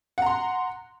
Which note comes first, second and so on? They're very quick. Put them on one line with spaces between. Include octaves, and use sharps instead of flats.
F#5 A#5 C6